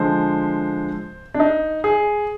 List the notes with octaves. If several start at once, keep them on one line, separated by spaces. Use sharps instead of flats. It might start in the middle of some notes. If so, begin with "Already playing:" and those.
Already playing: D3 F3 G#3 C5
D4
D#4
G#4